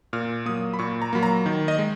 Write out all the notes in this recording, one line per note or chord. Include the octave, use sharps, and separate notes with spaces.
A#2 F6
F#3 A#3 D#6
B5
A#2 C#6
A#5
F#3 A#3 B5
A#5
D#3
D#5
G#3